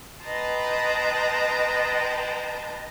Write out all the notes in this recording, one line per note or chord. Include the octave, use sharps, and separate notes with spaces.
B4 D#5 G5 A5 A#5 C6